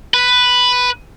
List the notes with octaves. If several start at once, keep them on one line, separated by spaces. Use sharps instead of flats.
B4